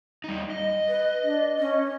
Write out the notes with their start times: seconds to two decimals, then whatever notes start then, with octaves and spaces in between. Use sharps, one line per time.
0.24 G3 D#4
0.50 D#5
0.88 B4
1.22 D4
1.59 C#4